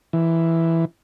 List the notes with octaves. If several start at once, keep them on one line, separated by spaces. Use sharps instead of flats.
E3